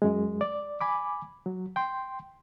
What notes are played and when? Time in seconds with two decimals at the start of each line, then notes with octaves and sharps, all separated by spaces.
0.02 F#2 G#3
0.41 D5
0.81 G#5 B5 D6
1.46 F#3
1.76 G5 C6